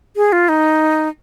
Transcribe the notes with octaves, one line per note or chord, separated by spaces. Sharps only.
G#4
F4
D#4